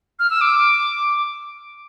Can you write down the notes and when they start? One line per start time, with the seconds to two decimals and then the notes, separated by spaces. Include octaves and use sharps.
0.19 F6
0.30 E6
0.41 D6